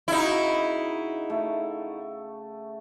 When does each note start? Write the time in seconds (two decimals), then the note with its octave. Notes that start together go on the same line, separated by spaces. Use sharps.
0.08 C#3 D#4 E4 F#4
1.30 A3